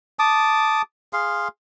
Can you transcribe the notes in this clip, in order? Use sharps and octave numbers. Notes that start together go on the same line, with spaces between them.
A5 D6 D#6
G#4 F5 C6